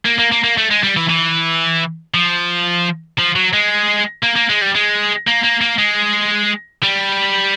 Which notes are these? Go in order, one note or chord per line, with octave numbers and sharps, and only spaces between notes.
A#3
A#3
A#3
A#3
A3
G#3
G3
E3
E3
F3
F3
F#3
G#3
A#3
A#3
G#3
G3
G#3
A#3
A#3
A#3
G#3
G3